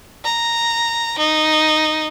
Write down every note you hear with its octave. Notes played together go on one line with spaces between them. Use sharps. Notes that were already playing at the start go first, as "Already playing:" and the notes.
A#5
D#4